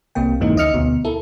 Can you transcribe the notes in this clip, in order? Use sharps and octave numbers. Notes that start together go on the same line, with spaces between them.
C2 C3 A#3 G5
F2 G#2 C#3 E3 A#3 D#4
D2 D#3 D#5 E5 F6 C#7
D2 B2
E4 A4 A#4